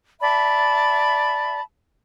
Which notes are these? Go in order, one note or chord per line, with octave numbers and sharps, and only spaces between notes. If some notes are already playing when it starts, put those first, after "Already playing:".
D5 E5 A5 B5